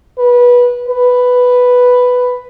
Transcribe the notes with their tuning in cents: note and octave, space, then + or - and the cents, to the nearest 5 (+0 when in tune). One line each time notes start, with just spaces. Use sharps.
B4 -20
B4 +5